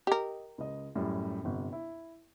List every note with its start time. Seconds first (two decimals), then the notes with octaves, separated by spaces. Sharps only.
0.07 G4 A#4 D#5
0.58 C#2 D#5
0.95 F#2 A2 G3
1.43 G1 C3
1.73 E4